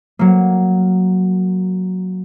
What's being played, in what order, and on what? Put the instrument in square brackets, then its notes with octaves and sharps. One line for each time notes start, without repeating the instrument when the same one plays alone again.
[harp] F#3 A#3